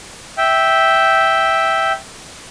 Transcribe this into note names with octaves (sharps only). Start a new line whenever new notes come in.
E5 G5